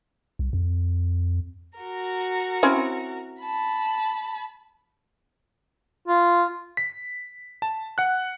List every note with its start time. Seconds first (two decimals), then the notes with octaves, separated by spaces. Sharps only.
0.39 C2
0.53 F2
1.79 F#4 A#4
2.63 C4 C#4 E4
3.41 A5 B5
6.08 F4
6.77 B6
7.62 A5
7.98 F#5 F#6